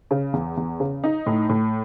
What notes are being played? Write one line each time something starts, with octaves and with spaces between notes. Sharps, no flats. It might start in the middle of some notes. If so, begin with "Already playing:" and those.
C#3
E2
E2
C#3
D#4
A2
A2